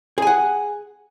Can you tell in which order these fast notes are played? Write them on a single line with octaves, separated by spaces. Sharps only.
G#4 G#5 F#5